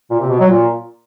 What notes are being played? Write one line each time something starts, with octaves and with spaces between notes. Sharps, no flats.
A#2
C3
B2
F#3
A#2